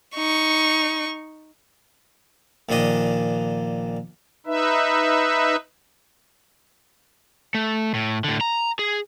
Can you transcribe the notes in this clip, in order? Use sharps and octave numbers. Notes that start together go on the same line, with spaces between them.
D#4 C#6
A#1 A#2 D#3 D4 D#5
D#4 B4 E5
A3
A2
A2 D3
A#5
G#4